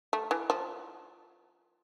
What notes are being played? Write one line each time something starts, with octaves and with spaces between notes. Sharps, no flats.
A3
E3
F3